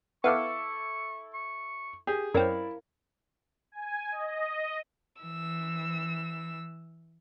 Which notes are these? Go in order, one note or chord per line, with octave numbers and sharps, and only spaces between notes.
B3 E4 A4 F5 C#6 D6
C#6
G4 G#4
F#2 C4 E4 A#4 C#5 D5 F5
G#5
D#5
E3 E6